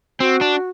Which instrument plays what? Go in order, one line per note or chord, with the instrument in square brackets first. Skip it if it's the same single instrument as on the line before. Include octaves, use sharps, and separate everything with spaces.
[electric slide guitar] C4 [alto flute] F#4
[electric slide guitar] D4